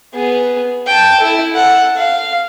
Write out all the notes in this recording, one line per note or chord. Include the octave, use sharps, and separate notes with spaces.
B3 G#4
G5 A5
E4 A4
A4 F#5
F5